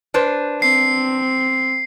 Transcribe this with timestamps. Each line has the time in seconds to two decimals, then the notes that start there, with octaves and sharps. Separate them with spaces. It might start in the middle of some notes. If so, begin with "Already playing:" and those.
0.14 D4 B4 C5
0.62 C4 C7